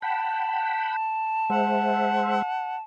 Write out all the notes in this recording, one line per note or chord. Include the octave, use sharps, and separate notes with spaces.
F#5 G5 A5 B5
G#3 C5 E5 F#5